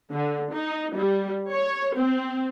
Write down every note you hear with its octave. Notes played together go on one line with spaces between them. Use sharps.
D3
D#4
G3
C#5
C4